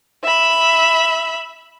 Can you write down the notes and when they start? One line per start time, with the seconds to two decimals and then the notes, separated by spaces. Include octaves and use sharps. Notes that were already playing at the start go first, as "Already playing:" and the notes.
0.23 E5 B5